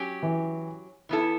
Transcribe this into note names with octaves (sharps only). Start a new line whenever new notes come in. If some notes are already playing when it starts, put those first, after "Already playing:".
Already playing: F#3 C#4 G4
E3
E3 B3 E4 A4